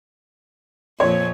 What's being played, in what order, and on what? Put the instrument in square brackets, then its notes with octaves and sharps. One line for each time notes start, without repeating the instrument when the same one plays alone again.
[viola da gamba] F2 A#2 F3 [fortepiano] C#5